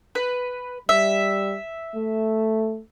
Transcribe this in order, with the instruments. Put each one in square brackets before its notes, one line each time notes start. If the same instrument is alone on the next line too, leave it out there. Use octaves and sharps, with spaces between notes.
[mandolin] B4
[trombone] G3 [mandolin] E5
[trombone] A3